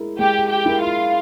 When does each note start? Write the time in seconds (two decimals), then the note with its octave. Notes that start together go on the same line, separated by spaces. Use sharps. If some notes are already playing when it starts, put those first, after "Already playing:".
Already playing: G#3 E4 A#4
0.19 G#3 G4 G5
0.50 G4 G5
0.66 E4 A#4
0.81 F4 F5